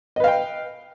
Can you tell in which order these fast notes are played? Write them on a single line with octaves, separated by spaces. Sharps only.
D#5 B4 F5 G5